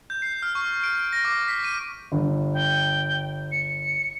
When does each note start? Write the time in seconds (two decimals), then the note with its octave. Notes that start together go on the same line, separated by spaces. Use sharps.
0.10 G6
0.22 C7
0.42 F6
0.55 C#6
0.83 D7
1.00 D7
1.13 A#6
1.25 D6
1.48 B6
1.64 D#7
2.12 G1
2.53 G5
3.51 C#7